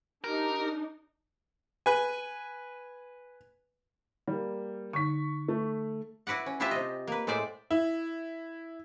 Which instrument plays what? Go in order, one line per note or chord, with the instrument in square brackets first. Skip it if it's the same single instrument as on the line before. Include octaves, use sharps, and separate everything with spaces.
[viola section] D4 D#4 [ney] G4 [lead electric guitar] A#4
[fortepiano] B4 G#5
[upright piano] G3 A#3
[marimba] D3 D#4 [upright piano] C#6 B6
[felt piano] A3
[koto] E4 F#4 B4 D5 F#5
C#4
D4 E4 F4 G4 C5 E5
C3 D#5
A#3 B4
A2 G#3 C5 D5 E5
[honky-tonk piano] E4